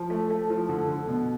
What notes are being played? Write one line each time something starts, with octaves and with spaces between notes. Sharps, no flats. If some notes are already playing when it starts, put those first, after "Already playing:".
Already playing: F3
A3
A3
F3
D3
D3
B2